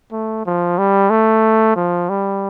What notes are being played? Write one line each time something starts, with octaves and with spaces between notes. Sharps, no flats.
A3
F3
G3
A3
F3
G3